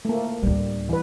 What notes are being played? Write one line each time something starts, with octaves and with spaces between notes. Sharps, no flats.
A3 A#3
D2 A2 G3
E3 B4